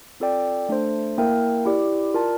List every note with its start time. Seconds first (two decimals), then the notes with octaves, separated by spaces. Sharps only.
0.20 C4 F4 A4 D5 G5
0.69 A3 D4 A4 C5
1.18 A#3 E4 A#4 E5 G5
1.65 E4 G4 D5
2.14 F4 A#4 D5 A5